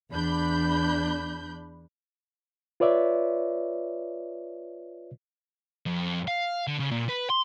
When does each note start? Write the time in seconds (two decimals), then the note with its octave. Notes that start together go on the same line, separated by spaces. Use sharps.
0.12 E2 D4 B5 G6
2.80 F4 B4 C#5 D5 E5
5.86 F2
6.28 F5
6.67 D3
6.79 C#3
6.92 A#2
7.09 B4
7.30 C6